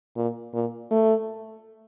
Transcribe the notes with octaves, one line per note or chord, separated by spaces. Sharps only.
A#2
A#2
A3